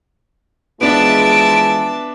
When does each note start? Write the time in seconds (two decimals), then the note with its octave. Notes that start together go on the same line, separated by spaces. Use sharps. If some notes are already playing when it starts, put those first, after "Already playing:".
0.81 E3 F3 G#3 B3 D4 E5 A5 D7